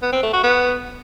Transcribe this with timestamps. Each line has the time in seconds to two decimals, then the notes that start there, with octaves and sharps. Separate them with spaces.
0.02 B3
0.13 C4
0.23 A3
0.33 F#4
0.43 B3